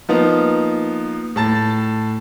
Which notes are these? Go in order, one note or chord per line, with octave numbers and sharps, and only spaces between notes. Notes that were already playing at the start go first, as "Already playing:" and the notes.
F3 A#3 B3 D#4
A2 A5 A6